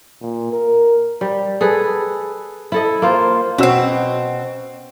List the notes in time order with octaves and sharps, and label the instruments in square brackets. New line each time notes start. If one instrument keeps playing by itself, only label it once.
[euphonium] A#2
A#4
[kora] G3
G#4 A4 B4
E4 A4 D#5
A#3 F4 C5
[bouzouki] B2 C4 [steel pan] C#4 F#4 E6